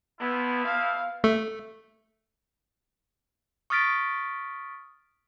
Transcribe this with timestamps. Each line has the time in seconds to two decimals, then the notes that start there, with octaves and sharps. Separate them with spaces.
0.20 F3 B3 E4
0.67 F5
1.24 A3
3.70 C#6 D#6 F6 A6 B6 D7